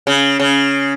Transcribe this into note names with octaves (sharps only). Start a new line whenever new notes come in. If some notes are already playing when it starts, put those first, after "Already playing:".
C#3
C#3